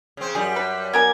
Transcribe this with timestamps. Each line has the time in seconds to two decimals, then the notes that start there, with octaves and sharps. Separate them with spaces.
0.17 C#3 C4
0.35 F#2 G3 G#4
0.56 B4
0.93 B3 A#4 G#5 G#6